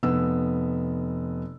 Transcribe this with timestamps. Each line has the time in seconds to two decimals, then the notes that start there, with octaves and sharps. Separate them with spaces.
0.03 F1 B3 E6